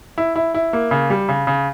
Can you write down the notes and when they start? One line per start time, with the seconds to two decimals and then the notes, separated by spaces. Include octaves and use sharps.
0.18 E4
0.36 E4
0.54 E4
0.73 A#3
0.91 C#3
1.10 G3
1.29 C#3
1.47 C#3